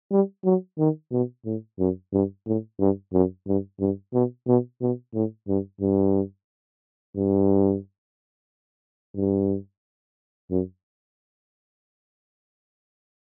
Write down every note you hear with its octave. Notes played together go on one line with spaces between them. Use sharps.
G3
F#3
D#3
B2
A2
F#2
G2
A2
G2
F#2
G2
G2
B2
B2
B2
A2
G2
G2
G2
G2
F#2